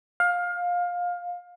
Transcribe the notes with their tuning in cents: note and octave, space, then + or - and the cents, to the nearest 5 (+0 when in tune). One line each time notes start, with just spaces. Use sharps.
F5 +20